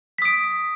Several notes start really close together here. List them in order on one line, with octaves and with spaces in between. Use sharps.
B6 D#6 D7